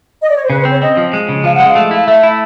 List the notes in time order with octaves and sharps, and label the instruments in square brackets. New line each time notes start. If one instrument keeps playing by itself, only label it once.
[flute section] D#5
D5
C#5
C5
[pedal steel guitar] C#3 [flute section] B4
[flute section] C5
[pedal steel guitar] C4
[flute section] C#5
[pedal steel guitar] C4 [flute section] D#5
[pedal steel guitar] F3
G#3
C#3
[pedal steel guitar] F3 [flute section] F5
[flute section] F#5
[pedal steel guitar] G#3
[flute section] F5
[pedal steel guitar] A3
[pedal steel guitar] E4 [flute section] F5
[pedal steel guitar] A3 [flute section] E5
[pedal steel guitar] E4